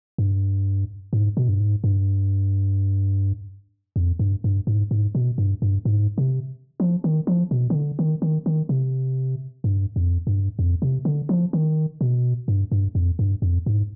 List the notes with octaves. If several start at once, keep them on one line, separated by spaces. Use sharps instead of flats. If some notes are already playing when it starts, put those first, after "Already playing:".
G2
G#2
B2
G2
G#2
G2
F2
G2
G2
G#2
G#2
B2
G2
G2
G#2
C3
F3
D#3
F3
B2
D#3
D3
D#3
D#3
D#3
C3
G2
F2
G2
F2
C3
D3
F3
D#3
B2
G2
G2
F2
G2
F2
G#2